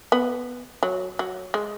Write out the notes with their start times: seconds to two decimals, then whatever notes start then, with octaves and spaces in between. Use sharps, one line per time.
0.12 B3
0.83 F#3
1.19 F#3
1.54 G#3